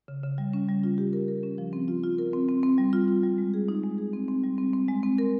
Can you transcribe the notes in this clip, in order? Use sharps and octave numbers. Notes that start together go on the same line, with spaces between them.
C#3
C#3
G3
C#4
G3
F4
G4
A#4
A#4
C#4
F3
C4
F4
F4
A#4
C4
C4
C4
G3
F4
F4
G3
G#3
G#4
D#4
G#3
G#4
C4
C4
G3
C4
C4
G#3
C4
A#4